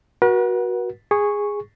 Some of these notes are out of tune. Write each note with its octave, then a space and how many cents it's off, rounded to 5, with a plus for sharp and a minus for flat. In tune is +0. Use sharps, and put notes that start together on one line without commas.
F#4 +0 B4 -45 F#5 +0
G#4 -10 C#6 -5